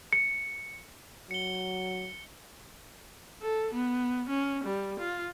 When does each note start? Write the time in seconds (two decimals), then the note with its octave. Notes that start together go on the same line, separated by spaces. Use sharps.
0.13 C#7
1.31 F#3 C#7 G7
3.42 A4
3.74 B3
4.29 C#4
4.64 G3
5.00 F4